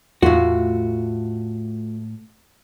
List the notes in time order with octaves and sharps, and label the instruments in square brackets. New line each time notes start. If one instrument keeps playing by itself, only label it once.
[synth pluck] E2 [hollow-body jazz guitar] A2 F#4 [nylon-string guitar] A3 F4